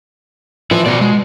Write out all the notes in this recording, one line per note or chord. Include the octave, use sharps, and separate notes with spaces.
F3 E4 B4
B2 F#4 D5
G#3